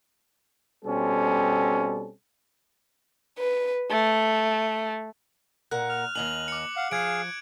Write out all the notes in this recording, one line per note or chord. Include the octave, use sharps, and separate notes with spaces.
B2 G3 C4 C#4 A4
B4
A3
A#2 A#4 F#5 F#6
F6
D#2 D#5 G#5 F#7
D6 C#7
F5 F#5
F3 G#4 F5 F#6 G#6 D7